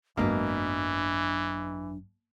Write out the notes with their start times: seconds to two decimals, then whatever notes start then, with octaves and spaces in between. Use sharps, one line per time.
0.17 G#1 F#2 B2 E3 A#3 D4